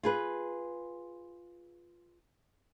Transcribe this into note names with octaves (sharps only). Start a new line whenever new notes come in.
F4 G#4 B4